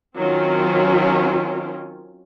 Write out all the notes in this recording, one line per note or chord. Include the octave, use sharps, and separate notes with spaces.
D#3 F#3 C4 C#4 F4